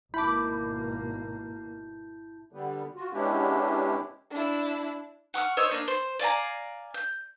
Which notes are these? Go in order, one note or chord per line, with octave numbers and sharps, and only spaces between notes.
G#1 B2 A#3 E4 A5 B5 D6 G6
D3 G3 B3
F4 F#4
G#3 B3 C#4 D4 E4 G4
D4 E4
F#5 C#6 D6 F6
C5 C#5 D#5 E6
A#3 D4
C5
D5 F5 G#5 A#5
G6